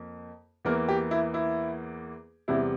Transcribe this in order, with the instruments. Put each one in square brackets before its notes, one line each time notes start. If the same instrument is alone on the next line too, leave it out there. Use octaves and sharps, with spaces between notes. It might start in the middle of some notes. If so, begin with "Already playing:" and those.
Already playing: [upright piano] F2 A#3
E2 E3 A#3 A#4
G4
E4
E4
E2 C3 G3 E4